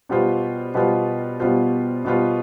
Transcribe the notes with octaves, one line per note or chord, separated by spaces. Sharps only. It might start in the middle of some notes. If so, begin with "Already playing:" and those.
B2 G3 B3 F4 C5
B2 G3 B3 F4 C5
B2 G3 B3 F4 C5
B2 G3 B3 F4 C5